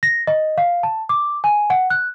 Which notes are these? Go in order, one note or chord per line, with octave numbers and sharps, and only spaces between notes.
A#6
D#5
F5
A5
D6
G#5
F#5
F#6